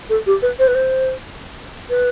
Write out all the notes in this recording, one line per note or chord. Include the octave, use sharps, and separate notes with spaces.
A4
G4
B4
C5
B4
C5
B4